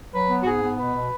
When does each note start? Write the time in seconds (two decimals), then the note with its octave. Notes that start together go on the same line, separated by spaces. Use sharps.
0.13 F#3 B4
0.29 B3
0.42 F#4
0.46 G#2 G#4
0.62 B3
0.79 B2 B4
0.95 B2